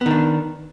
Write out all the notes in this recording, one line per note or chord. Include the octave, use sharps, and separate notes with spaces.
D#3 B3 D4